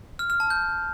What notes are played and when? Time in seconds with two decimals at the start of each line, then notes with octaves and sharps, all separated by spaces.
0.19 F6
0.30 F6
0.40 A5
0.50 G6